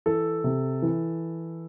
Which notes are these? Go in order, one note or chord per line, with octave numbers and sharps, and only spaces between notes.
E3 A4
C3
E3